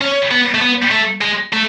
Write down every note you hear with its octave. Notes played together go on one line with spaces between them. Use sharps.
C#4
B3
A3
B3
A3
G#3
A3